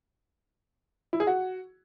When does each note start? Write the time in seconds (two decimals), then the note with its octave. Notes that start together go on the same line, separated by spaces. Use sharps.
1.13 E4
1.20 G#4
1.27 F#4